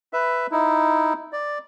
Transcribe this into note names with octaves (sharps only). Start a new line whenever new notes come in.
B4 E5
D#4 E4
D5